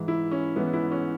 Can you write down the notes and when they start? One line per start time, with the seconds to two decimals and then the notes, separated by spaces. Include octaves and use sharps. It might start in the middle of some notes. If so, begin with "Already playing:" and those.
Already playing: G#2 E3
0.08 E4
0.31 C#4
0.56 G#2 E3 B3
0.73 E4
0.92 C#4